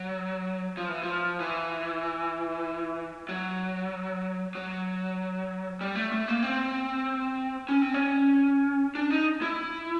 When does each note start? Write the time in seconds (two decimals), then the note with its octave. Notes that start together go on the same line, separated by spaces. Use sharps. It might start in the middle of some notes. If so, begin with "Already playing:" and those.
Already playing: F#3
0.77 F3
0.89 E3
1.03 F3
1.40 E3
3.29 F#3
4.55 F#3
5.81 G3
5.95 A3
6.12 A3
6.28 A#3
6.43 C4
7.69 C#4
7.82 C4
7.94 C#4
8.95 D4
9.10 D#4
9.42 E4